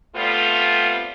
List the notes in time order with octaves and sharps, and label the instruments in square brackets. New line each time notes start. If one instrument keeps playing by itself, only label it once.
[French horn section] G3 A3 B3 C4 F4